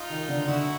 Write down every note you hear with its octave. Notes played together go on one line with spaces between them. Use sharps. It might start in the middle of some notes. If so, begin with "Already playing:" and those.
Already playing: D#4 F4
D#3
D3
D3 E4 F#4